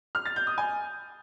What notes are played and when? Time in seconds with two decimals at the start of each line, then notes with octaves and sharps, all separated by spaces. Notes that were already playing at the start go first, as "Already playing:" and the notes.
0.15 F6
0.25 A6
0.36 G6
0.47 D#6
0.58 G#5